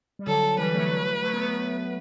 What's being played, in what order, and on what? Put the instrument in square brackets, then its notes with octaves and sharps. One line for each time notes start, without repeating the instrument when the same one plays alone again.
[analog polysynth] G3
[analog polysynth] D3 F#3 [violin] A4
[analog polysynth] E3 G3 [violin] B4
[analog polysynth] F#3 A3
F#3 A3
B3
F#3 A3